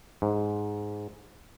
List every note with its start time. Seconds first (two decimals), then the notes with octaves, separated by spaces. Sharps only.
0.22 G#2